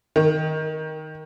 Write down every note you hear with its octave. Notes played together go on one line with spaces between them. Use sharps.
D#3